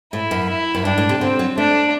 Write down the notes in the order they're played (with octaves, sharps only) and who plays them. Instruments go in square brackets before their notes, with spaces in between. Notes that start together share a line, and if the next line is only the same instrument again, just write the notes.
[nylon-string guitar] A2 [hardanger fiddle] E4
[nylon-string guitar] F#2
[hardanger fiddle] E4
[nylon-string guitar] F#2
[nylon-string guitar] G2 [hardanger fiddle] D4
[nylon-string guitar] A2
C3
[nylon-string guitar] D3 [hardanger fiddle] C4
[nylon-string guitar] F#3
[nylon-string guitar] A3 [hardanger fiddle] D4